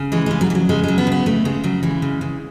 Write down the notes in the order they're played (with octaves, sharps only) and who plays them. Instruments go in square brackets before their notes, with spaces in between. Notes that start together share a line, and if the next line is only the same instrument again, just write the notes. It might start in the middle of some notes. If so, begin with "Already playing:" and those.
Already playing: [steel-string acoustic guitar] C#3
E3 G#3
C#3 G#3
F#3
E3
F#3
C#3 G#3
F#3 G#3
B3
C#3
B3
C#3 A3
C#3 G#3
C#3 F#3
E3 G#3
C#3
C#3